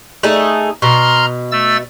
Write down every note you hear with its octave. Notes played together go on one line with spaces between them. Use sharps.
A3 D#4 G#4
B2 A#5 C6 F6
A3 E6 A6